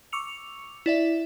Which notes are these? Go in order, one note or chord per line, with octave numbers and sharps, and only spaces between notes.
C#6 D6 E6 C#7 F7
E4 D5 E5